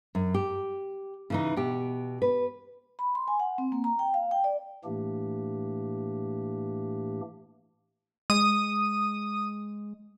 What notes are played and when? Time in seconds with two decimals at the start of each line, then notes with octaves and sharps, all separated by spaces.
0.15 F#2
0.34 G4
1.30 C#3 E3 D#4
1.57 B2 G4
2.22 B4
2.99 B5
3.15 C6
3.28 G#5
3.40 F#5
3.58 C4
3.72 A#3
3.84 A#5
3.99 G5
4.14 F5
4.31 G5
4.44 D5
4.85 A2 E3 A3 A#3 D4 G4
8.30 G#3 D#6